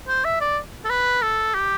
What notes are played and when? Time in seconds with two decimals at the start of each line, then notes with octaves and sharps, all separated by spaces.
0.08 C5
0.24 E5
0.41 D5
0.85 A4
0.89 B4
1.22 A4
1.54 G4